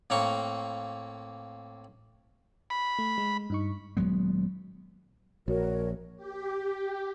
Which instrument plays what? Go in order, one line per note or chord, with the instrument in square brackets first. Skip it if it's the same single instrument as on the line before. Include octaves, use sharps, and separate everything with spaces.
[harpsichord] A2 A#3 C4 A#5 C#6
[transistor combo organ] B5
[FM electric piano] A3
G#3
G2 D#4 C#6
[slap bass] D#1 F#3 G#3 B3
[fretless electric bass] A#1 [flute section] F#4 A#4 C#5
[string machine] G4